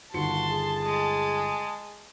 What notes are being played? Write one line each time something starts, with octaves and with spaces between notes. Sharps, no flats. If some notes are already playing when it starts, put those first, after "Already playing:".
G1 D#2 F#4 A5 C6 C#7
G#4
G#3